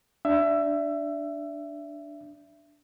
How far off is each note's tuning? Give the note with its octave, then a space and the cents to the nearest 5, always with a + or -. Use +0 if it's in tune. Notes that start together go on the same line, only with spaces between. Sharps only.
D4 +0 E5 +20